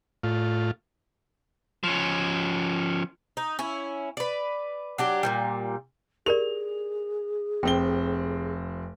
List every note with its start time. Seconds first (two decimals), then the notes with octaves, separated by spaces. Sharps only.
0.23 A2 F4
1.83 F3 C#4
3.37 D#4
3.59 C#4 E4
4.17 B4 D5
4.98 F#3 D4 G4
5.23 A#2 D#3 G3
6.26 G4 G#4 A#4 D5 F7
7.63 F1 C4 G5 G7